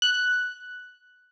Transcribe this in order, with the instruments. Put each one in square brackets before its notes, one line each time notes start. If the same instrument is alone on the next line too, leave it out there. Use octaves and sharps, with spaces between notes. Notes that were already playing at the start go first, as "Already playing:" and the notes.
[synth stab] F#6